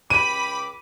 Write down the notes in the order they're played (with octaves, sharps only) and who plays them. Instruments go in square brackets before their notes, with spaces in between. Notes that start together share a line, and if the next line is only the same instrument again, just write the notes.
[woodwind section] C#2 G5 D6 [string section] B5 [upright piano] D#7